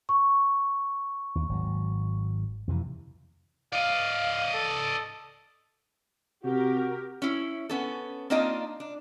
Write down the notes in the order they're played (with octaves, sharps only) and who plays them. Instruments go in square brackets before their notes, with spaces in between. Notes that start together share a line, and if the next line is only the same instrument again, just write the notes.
[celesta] C#6
[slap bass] D#2
G#1 F#3
F2 C3 E3
[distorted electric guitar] D5 D#5 [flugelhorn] F5
[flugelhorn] A4
[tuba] C3 [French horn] F#4 [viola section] G4 A#4
[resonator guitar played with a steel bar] C#4 E4
B3 C#4 A4
A#3 C4 D4 D#4 F4 D#5
D4